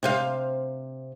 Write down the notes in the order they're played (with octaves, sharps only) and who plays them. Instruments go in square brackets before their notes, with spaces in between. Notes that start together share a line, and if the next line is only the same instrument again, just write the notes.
[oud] C3 C5 F5